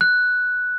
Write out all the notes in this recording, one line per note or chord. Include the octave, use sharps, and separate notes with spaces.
F#6